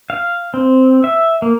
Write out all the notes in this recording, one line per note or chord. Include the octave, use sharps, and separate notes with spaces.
F5
C4
E5
A#3